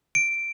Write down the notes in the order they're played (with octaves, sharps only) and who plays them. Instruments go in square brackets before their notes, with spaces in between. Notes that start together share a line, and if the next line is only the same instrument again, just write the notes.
[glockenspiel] D7